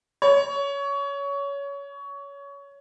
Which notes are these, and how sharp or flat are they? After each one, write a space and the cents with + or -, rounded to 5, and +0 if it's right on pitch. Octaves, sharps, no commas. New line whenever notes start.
C#5 +20